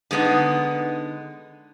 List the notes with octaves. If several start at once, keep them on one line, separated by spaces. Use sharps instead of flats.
D3 G#3 A#3 B3 D#4